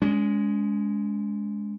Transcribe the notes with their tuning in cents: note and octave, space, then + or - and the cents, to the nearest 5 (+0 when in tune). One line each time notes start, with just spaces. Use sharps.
G#3 +0 C#4 +45